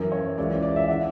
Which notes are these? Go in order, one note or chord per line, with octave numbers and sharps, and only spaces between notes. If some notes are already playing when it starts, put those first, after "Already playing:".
Already playing: F#2 E3 A#4
C#5
C#2 C#3 E3 D5
D5
E5
C#3 E3 F#5